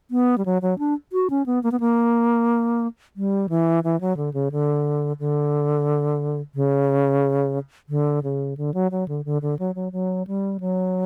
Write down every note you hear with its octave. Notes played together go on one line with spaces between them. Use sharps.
B3
G3
F#3
F#3
D4
F#4
C#4
B3
A#3
B3
A#3
G3
E3
E3
F#3
D3
C#3
D3
D3
C#3
D3
C#3
D3
F#3
F#3
D3
D3
D3
F#3
F#3
F#3
G3
F#3